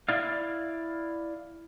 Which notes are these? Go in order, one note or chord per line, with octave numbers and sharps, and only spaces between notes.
E4 D5 F5